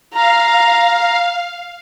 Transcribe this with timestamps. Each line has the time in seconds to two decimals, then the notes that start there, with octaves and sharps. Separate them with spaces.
0.14 F5 A#5